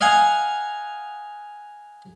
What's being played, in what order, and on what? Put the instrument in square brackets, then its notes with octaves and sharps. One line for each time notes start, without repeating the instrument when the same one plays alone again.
[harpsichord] D#5 F5 F#5 G#5 A#5